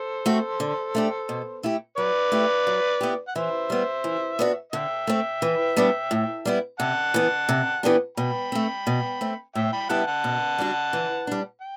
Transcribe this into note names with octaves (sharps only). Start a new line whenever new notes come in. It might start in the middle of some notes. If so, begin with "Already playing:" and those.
Already playing: A4 C5
A3 C4 F#4
D3
A3 D4 G4
B2
A3 E4 G4
F#3 B4 D5
A3 E4 G4
F#3
B3 E4 G4
F#5
E3 C5 E5
G3 B3
E3
B3 D4 F#4
D3 E5 G5
A3 C4
E3
G3 B3 D4
A2
G3 B3 E4
C3 F#5 A5
E3 B3
C3
E3 B3 D4 G4
B2 G5 B5
A3 C4
B2
A3 C4
A2 E5 G5
G5 B5
G3 B3 E4 G4 F#5 A5
F#5 A5
B2
G3 D4 F#4
E3
G3 D4
G5